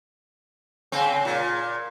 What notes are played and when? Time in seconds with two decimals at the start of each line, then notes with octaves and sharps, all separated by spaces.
0.92 C#3 C4
1.25 A#2